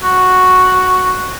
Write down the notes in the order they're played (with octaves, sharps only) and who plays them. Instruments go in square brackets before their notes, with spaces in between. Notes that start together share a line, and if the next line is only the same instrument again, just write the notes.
[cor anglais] F#4